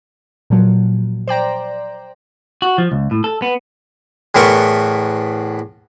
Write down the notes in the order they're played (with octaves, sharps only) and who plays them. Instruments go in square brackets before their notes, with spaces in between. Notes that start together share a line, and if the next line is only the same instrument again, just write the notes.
[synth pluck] A#2 F3 F#3
C5 D5 G5 A#5
[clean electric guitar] F#4
F3
C#2
A2
A4
B3
[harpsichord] E2 A2 B3 A#4 C6 C#6